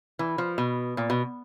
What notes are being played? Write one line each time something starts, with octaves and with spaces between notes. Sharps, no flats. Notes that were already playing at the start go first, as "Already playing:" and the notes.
E3
F3
B2
A#2
B2